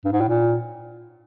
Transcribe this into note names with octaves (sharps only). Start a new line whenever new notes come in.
G2
G#2
A2
A#2